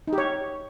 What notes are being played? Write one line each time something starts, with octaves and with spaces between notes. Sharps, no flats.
D#4
G4
C#5